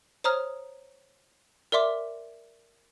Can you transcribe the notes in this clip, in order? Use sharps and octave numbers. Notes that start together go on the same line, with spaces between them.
C5 C#5 A#5 D#6 F6
A#4 D5 E5 C6 D6